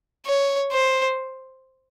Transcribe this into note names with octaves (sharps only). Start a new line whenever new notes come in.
C#5
C5